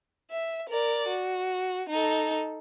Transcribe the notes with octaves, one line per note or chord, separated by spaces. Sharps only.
E5
A#4 D5
F#4
D#4 A4